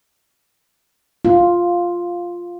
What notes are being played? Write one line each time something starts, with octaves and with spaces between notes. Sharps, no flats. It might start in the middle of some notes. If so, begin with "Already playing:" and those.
F4